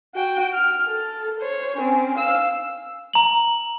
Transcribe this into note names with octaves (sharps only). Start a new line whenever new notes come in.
F#4 G5
F6
A4
C5 C#5
C4 C#4
F5 E6
A#5 F#7